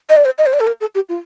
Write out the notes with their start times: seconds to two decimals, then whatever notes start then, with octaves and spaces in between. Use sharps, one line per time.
0.10 D#5
0.16 D5
0.25 C5
0.38 D#5
0.46 C5
0.53 D5
0.60 A4
0.67 A#4
0.81 A4
0.95 G4
1.09 F4